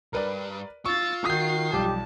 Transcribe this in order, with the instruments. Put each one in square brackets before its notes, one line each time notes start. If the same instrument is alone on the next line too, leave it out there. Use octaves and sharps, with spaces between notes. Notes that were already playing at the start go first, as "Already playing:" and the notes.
[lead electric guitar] C2 G2 [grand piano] A#4 B4 D5
[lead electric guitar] F4 [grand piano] C#6 [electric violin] E6 A6
[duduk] D#3 [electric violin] F#4 C7 [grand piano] D#6 G6
[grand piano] B1 F3 G3 [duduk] G4 [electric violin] A5